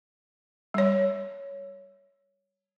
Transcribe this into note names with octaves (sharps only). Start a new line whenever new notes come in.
G3 C#5